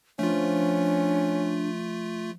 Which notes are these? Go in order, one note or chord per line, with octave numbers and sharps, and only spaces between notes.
F3 A3 C#4 D4 F4